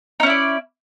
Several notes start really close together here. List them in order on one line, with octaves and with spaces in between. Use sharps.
D#4 C#4 E4 D5